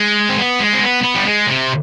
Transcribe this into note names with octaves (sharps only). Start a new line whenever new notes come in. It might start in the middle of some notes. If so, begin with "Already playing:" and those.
Already playing: G#3
C4
B3
G#3
C4
B3
B3
G3
G#3
C3